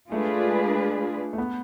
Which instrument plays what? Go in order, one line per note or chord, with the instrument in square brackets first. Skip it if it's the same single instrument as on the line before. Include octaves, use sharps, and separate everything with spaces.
[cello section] G#3 D4 F4 G#4 B4 [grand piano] A3
[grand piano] A3
B3